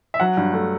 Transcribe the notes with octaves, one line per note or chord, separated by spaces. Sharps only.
E5
F#3 F#5
G2
A3